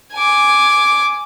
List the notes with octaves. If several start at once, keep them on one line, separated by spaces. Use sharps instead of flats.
G#5 D6